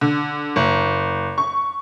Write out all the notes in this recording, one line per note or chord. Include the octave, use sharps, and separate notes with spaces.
D3
F#1
C#6